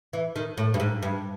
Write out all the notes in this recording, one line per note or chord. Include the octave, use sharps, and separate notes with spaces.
E3
D#3
A2
G2
G#2
G2